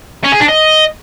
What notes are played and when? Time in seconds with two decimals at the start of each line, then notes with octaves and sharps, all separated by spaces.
0.25 C#4
0.33 G#4
0.41 D4
0.49 D#5